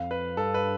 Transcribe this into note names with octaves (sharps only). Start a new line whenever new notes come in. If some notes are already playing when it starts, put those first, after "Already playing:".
Already playing: F2 F5
B4
G2 A4
B4